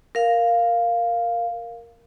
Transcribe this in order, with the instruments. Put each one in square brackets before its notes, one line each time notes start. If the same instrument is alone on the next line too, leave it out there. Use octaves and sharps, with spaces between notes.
[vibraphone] A#4 F5